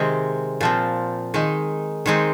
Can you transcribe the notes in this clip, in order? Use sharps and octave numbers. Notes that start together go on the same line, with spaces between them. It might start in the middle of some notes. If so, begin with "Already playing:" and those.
Already playing: C3 D#3 G#3 C4
A#2 F3 C4
D#3 G#3 D#4
D#3 G#3 C4 D#4